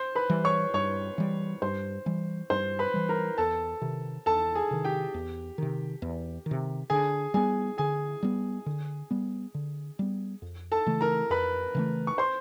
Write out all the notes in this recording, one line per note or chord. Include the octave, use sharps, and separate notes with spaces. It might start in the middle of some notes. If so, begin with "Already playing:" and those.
Already playing: C5 C6
B4 B5
E3 G3
C#5 C#6
G2 C#5 C#6
E3 G3
G2 C5 C6
E3 G3
G2 C5 C6
B4 B5
E3 G3
A#4 A#5
E2 A4 A5
C3 D#3
E2 A4 A5
G#4 G#5
C3 D#3
G4 G5
E2
C3 D#3
E2
D#3
C3
D3 G#4 G#5
G3 B3 G#4 G#5
D3 G#4 G#5
G3 B3
D3
G3 B3
D3
G3 B3
F2
A4 A5
C#3 E3 A3
A#4 A#5
F2 B4 B5
C#3 E3 A3
C#6
C5 C6